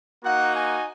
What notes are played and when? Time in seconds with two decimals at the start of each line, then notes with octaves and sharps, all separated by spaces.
0.23 A#3 D#4 F#4 F#5
0.54 G#5